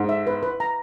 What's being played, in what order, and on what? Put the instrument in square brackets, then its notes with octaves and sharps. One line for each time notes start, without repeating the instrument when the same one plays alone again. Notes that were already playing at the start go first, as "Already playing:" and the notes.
Already playing: [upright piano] G#2
[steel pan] E5
B4
B4
A#5